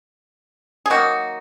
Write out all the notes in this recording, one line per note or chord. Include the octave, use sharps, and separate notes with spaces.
G#4
D#3 F#3 A#3 D#4 F#4